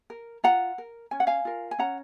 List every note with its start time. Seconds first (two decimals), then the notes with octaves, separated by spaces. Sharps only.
0.10 A#4
0.44 F4 F#5 A#5
0.78 A#4
1.11 C#4 G#5
1.20 F#5
1.27 F5 G#5
1.45 F4 A#4
1.71 G#5
1.79 C#4 F#5 A#5